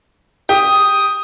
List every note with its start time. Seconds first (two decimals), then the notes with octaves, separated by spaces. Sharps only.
0.49 G4 D#6